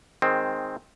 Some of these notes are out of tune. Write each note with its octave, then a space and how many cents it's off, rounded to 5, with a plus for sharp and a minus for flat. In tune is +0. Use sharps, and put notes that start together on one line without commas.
D#3 +0 G#3 +0 C4 +5